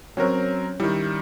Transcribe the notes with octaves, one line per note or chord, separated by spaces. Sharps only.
F#3 C4 C#4 A#4 F#6
D#3 G3 E4